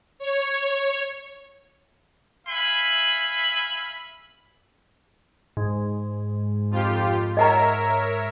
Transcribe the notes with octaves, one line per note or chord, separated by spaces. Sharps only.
C#5
E5 F5 G#5 B5
G#2
F2 F4 G4
A#4 C#5 D#5 E5 F#5 A#5